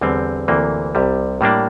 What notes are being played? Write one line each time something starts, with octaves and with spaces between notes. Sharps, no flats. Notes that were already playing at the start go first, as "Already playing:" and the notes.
E2 D3 G3 C4
D2 C3 E3 A#3
C2 C3 G3
A2 G3 A#3 D4